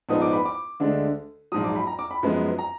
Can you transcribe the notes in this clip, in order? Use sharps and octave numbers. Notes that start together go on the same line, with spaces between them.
A#1 G#2 F3 B3 D#4 D#6
D6
B5
D6
D2 D3 G#3 D4
A#1 G#2 F#3 D#6
D6
B5
A#5
D6
B5
F#2 F3 G#3 B3
A#5